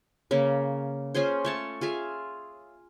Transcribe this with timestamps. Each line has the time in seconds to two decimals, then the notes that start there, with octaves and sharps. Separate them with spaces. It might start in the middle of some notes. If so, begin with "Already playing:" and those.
0.31 C#3 A#3
1.14 C#4 F4 G#4 C5
1.45 A3 C#5 A5
1.81 F4 G#4 E5 F5